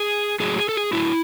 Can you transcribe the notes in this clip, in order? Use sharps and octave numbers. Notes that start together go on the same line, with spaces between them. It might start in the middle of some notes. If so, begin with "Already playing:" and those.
Already playing: G#4
A2 F#3 G#4
G#4
A4
G#4
A2 F#3 E4